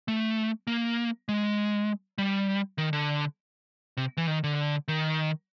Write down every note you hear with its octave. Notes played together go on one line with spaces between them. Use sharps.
A3
A#3
G#3
G3
D#3
D3
C3
E3
D#3
D3
D#3